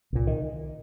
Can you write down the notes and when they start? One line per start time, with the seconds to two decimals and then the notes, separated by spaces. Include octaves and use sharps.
0.13 C2 A#2
0.27 D#3